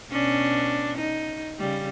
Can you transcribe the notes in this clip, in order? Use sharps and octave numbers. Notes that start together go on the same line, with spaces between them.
B2 C#4 D4
D#4
C#3 G3